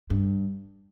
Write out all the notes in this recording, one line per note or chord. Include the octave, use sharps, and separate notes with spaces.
G2